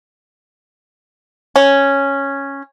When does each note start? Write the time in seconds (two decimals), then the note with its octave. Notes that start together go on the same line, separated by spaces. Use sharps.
1.56 C#4